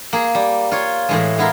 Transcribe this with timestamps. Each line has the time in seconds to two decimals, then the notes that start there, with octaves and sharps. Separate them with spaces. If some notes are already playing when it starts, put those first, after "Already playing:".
0.13 A#3 G#4
0.35 G3
0.72 F4 C#5
1.09 A2 E3 G#3
1.38 G#3 B3 E4 F4 A#4